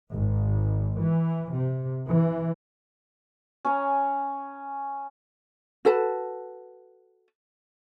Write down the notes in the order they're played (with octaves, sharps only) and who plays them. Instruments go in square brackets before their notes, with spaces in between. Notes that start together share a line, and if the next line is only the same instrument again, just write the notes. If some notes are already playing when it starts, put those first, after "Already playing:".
[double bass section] G#1
E3
C3
E3
[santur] C#4 C#5 G#5 A#5
[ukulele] F#4 A4 B4 A5